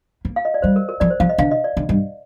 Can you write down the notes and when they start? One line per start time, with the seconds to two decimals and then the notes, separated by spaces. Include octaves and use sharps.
0.25 A#3
0.36 F5
0.45 D#5
0.54 D5
0.62 G3 C5
0.76 A#4
0.89 A#4
1.00 F3 D5
1.10 C5
1.20 F3 F5
1.29 D#5
1.38 D3 F5
1.51 D#5
1.64 D5
1.77 D3
1.89 G2